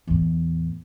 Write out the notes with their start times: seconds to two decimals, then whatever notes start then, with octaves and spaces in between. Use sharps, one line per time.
0.07 E2 A2